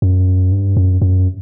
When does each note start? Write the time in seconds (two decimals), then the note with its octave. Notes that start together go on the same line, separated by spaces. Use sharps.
0.02 F#2
0.52 G2
0.77 F#2
1.02 F#2